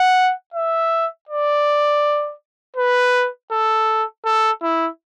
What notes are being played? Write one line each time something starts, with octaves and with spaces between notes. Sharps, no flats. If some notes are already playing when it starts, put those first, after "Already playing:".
Already playing: F#5
E5
D5
B4
A4
A4
E4